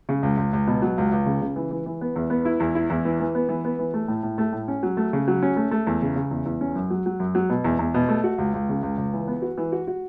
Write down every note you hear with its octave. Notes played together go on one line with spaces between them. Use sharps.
C#3
C#2
C#2
C#2
B2
F#3
C#2
C#2
C#3
C#3
E3
E3
E3
B3
E2
B3
E4
E2
E4
E2
E3
E3
B3
E3
B3
E3
A3
A2
A2
A3
A2
C#4
F#3
A3
C#3
F#3
C#4
A3
A3
E2
C#3
C#3
E2
E2
C#4
F#2
F#3
F#3
F#2
F#3
B2
E2
E2
B2
A3
F#4
C#2
C#2
C#3
C#2
C#2
E3
B3
F#4
E3
F#4
F#4